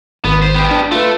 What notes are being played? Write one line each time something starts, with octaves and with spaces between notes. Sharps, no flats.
G#1 B3
C5
B3 G4
D4
A3 F4 B4